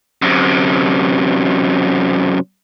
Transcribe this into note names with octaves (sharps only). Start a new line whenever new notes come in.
F#2 C3